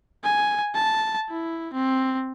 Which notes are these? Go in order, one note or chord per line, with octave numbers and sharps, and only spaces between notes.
G#5
A5
E4
C4